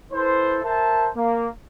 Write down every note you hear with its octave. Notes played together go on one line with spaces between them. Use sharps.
E4 A4 B4 C5
A#4 C5 E5 A5
A#3